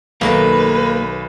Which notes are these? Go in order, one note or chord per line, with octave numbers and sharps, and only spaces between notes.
B1 D#3 A3 A#3 B4 A#5